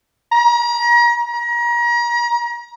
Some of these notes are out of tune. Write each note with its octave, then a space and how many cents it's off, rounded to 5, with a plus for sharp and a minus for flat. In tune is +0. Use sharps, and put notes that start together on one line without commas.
A#5 +35
A#5 +35